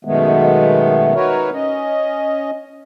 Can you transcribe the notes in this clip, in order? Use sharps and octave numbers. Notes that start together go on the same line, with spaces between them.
F#2 B2 D#3 G#3 A3 B3
D#4 F#4 A#4 B4 C#5
C#4 D#5